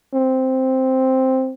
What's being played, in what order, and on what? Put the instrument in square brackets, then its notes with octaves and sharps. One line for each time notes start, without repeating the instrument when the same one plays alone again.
[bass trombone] C4